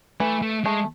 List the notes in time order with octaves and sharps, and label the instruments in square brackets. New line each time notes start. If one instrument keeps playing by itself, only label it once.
[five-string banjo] E3 [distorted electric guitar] A3
[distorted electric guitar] A3
[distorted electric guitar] G#3 [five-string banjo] A3